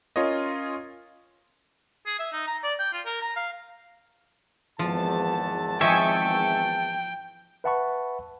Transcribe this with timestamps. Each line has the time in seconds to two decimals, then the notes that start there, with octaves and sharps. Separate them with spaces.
0.16 C#4 F4 A#4 C#5 D#5
2.06 G#4
2.19 E5
2.32 D#4
2.47 A#5
2.63 D5
2.79 G5
2.93 F4
3.06 A#4
3.22 A#5
3.36 F5
4.79 G#1 E2 F3 A5
5.81 F3 D#5 E5 G5 G#5 C#6
7.64 B4 E5 F#5 A5 B5 C#6